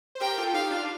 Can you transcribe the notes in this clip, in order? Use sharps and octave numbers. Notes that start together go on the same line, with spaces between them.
C5
G4 A#4 G5
F4 A4
D#4 G4 F5
D4 F4